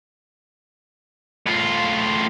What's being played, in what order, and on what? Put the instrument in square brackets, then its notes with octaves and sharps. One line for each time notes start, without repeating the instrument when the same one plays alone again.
[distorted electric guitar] A2 F4